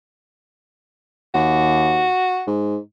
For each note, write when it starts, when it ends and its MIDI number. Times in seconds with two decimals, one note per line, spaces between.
1.34 2.09 39
1.34 2.45 66
2.47 2.78 44